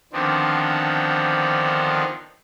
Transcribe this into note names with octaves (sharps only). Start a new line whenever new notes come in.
D3 D#3 F3 B3 C4 D4